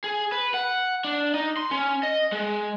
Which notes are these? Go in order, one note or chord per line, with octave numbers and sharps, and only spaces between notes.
G#4
B4
F#5
D4
D#4
C6
C#4
D#5
G#3